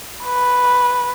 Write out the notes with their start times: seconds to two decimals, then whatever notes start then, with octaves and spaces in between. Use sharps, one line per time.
0.24 B4